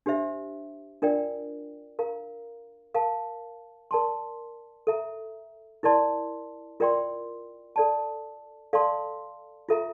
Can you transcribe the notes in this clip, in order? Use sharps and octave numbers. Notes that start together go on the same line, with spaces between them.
D4 G4 C5 E5
D4 F4 A#4 D5 G5
A#4 F5 A#5
A#4 F5 A5
A#4 D5 A5 C6
A4 E5 A#5
E4 A#4 D5 A5 C6
F4 A#4 D5 G5 C6
A4 D5 A5
A4 D5 F5 A5 C6
F4 A4 E5 A#5